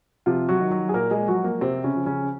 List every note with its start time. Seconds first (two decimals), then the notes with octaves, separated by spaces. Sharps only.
0.26 C3 F3 F4
0.49 F#3 F#4
0.60 D#3
0.71 F#3 F#4
0.89 G#4
0.94 A#2 A#3 A#4
1.11 G#3 G#4
1.28 F3 F#3 F#4
1.44 A#3
1.61 C3 C4
1.84 C#3 C#4
1.96 F3
2.06 C#3 C#4